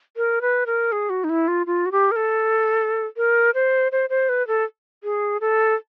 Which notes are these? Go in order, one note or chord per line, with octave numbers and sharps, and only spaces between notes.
A#4
B4
A#4
G#4
F#4
D#4
E4
F4
F4
F#4
G4
A#4
A4
A#4
C5
C5
C5
B4
A4
G#4
A4